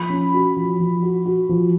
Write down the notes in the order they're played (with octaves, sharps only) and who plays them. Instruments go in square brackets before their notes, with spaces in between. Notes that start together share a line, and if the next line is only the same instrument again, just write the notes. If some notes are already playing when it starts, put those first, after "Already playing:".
Already playing: [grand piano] F3 [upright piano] B5
[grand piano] C#4
F#4
F3
F3
F#4
F#4
F3